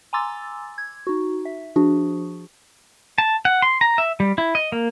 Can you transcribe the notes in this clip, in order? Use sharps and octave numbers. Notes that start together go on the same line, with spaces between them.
G#5 A#5 C6 D6 E6 A6
G#6
D#4 F#4
E5
F3 D4 F#4 G#4
A5
F#5
C6
A#5
E5
G3
E4
D#5
A#3